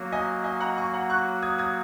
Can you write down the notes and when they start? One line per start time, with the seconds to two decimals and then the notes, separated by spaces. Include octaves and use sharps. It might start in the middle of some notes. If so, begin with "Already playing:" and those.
Already playing: F#3 A#3 F#4
0.12 D#5 G#5
0.44 D#5 G#5
0.60 F#5 A#5
0.78 G#5 C#6
0.94 F#5 A#5
1.10 C#6 F#6
1.42 D#6 G#6
1.58 D#6 G#6